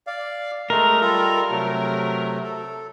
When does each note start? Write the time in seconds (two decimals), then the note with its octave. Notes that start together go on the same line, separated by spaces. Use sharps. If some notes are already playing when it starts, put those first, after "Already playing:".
0.07 D5 F5
0.70 G#3 A3 A#4
1.01 G3 F4 A4
1.50 C3 F#3 A3
2.43 A4